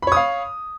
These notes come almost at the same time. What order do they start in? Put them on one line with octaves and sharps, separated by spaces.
B5 C#5 D#6 F5